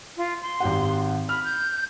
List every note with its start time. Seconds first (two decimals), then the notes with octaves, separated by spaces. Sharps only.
0.17 F4
0.42 C6
0.60 G#1 G4 F#5
1.29 B5 F6
1.44 G6